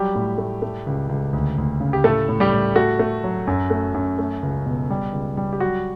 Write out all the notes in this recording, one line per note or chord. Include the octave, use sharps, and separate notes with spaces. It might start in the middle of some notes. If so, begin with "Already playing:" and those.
Already playing: F#3 G3 G4
A2
A3
A3
C#2
C#2
D2
D2
C#3
G4
A2 A3 A4
A2
G3 G4
A2
A3 F#4
A3
F#3
F#2
A3
F#2
A3
C#2
B2
G3
C#2
G3
G4
F#3 F#4